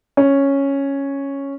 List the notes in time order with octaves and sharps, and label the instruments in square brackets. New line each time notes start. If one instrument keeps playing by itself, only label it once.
[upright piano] C#4